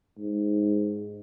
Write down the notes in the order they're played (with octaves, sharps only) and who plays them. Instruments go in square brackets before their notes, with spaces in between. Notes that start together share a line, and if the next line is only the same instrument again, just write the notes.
[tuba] G#2